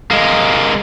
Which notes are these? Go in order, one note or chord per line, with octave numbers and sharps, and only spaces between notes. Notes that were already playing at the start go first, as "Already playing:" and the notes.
G#3 A#3